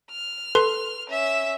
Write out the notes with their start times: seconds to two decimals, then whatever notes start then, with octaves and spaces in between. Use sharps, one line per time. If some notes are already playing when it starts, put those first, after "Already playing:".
0.11 F6
0.55 A4 B4 C6
1.09 C#4 E5